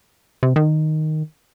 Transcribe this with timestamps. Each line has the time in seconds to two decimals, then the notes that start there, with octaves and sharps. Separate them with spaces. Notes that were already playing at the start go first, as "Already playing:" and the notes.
0.43 C3
0.56 D#3